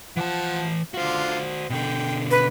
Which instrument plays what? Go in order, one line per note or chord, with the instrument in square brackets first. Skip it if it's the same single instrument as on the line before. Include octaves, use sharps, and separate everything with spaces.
[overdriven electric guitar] E3 A5 [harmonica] F3 F#5
[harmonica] D3 F4 [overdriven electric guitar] F#4 C5
[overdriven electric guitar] B2 D3 [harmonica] G5
[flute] B4